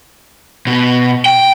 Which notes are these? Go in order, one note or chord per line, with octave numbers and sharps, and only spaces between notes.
B2
G5